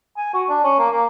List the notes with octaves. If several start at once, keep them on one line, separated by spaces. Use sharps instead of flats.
G#5
F#4
D4
C#4
A#3
A#3